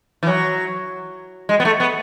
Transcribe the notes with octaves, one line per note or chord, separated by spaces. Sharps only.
E3
F#3
G#3
B3
A3
B3